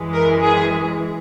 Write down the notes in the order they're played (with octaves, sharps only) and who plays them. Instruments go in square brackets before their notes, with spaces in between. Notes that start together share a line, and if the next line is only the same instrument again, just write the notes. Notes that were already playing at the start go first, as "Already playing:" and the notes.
Already playing: [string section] F#2 E3 G#3
A#4
G#4